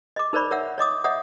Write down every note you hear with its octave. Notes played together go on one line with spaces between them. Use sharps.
D#5 D6
D#4 A#4 C5 D5 B5 C#6
A#4 C#5 E5 F#5 E6
C#5 D#5 D6 D#6
C#5 D#5 E5 F#5 D#6